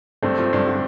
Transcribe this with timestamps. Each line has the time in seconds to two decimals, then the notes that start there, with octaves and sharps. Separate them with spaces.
0.23 G2 A3 C4
0.38 F3
0.53 G2
0.67 D3